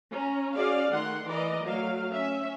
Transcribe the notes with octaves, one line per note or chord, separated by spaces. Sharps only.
C#4 A#5
C#4 F#4 G#4 D5 F5
D#3 A3 F#5 C6
E3 A#4 D5 D#5
F#3 A3 F5
C#4 E5